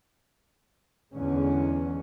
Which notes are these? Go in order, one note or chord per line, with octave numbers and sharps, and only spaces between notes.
E2 D3 E3 G#3 C#4